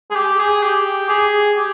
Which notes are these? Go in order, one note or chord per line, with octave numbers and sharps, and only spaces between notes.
G#4
G4
G#4
G4
G#4
G4